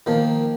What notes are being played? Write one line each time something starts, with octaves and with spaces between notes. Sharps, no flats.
D#3 F3 A#3